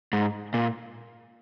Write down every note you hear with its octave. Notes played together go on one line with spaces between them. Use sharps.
G#2
A#2